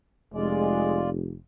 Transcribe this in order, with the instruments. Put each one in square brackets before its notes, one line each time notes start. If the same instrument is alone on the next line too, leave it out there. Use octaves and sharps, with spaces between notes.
[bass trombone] F1 [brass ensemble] G#3 [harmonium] F4 D5